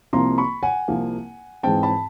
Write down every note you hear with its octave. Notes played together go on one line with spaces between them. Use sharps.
C2 C3 F3 A#3 A#5 C6
B5 C#6
F#5 G#5
C2 C3 F3 A#3
G#2 E3 G#3 C4 G5 A5
A5 B5